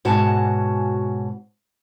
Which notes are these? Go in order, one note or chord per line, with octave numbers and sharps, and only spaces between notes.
G#2 B2 F#4 C#5 G#5 A5